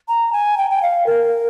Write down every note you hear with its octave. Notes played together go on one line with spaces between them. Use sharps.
A#5
G#5
G5
G5
F5
A#4